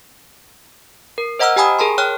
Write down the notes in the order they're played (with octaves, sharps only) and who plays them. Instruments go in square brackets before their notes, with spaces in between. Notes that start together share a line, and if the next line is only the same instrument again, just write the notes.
[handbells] A#4
C5 D#5 F#5 A#5 E6 F6
G4 G5 G#5 A#5 B5 D#6
G#4 A#4 A5 C6
C#5 G5 F6 F#6